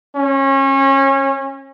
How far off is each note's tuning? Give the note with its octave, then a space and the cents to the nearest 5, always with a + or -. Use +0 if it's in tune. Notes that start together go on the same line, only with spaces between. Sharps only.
C#4 -30